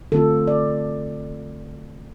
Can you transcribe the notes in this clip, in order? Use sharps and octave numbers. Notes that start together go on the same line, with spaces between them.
D3 A3 C4 F4 A4
D5